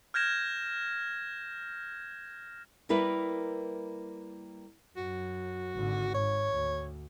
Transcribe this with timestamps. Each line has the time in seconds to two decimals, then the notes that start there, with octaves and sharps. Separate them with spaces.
0.14 F6 G6 G#6 A#6 E7
2.89 G3 A#3 E4 A#4 B4
4.97 F#2 F#4
5.75 G#1 D3
6.14 G#2 C#5
6.53 D2